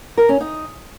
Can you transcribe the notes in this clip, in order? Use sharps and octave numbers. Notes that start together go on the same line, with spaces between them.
A#4
C#4
D#4